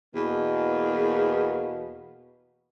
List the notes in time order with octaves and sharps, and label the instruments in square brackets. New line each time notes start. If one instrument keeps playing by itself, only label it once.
[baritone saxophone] E2 [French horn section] B2 A#3